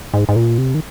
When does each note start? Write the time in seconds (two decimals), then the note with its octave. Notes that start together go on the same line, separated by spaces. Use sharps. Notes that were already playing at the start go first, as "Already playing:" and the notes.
0.14 G#2
0.29 G#2
0.36 A#2
0.58 C3
0.74 D#3